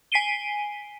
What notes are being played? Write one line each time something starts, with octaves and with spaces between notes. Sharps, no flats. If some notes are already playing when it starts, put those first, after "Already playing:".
G#5 B6 C7 D7 D#7 G7